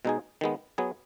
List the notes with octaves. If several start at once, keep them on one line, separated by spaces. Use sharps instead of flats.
B2 G#3 D#4 G#4
D#3 G#3 B3
F#3 B3 G#4